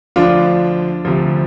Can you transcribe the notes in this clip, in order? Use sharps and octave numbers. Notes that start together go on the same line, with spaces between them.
D2 D3 F3 D4 F4
D2 C3 F3